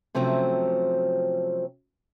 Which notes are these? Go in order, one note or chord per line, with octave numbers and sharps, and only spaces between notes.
C3 F3 F#3 A3 C4 C#4